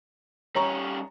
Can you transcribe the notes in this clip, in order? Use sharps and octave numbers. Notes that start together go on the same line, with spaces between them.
G3 C#4 C#5 A#5 C#6